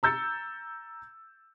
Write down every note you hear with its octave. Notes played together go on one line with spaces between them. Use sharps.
A#5 E6 G6 A6 C#7